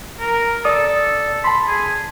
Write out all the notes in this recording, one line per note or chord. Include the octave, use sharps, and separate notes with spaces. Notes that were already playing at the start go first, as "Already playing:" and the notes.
A#4
A4 D5 D#6
A5 B5 C6
G#4